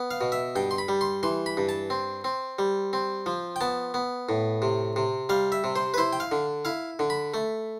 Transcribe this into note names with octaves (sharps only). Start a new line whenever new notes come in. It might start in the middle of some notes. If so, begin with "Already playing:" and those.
Already playing: B3
F5
B2
E5
G2 G5
C6
B5
G3
C6
E3 C6
B5
G2
A5
C4
C4
G3
C4
F3
G5
B3 A5
B3
A2
C3
C3
G3 F5
E5
C3
C5
B4
E4 C5
G5
F5
D3
E4 F5
D3
B5
A3